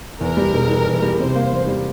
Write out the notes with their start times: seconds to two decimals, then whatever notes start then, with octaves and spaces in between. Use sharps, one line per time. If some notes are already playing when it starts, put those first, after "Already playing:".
0.20 E2 A#4
0.37 G3
0.54 E1
0.69 E3
0.86 E2
1.02 G3
1.19 C3 C5
1.35 A#3
1.51 E2
1.67 G3